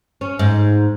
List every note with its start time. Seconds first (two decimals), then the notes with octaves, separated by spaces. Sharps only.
0.21 C#4
0.39 G#2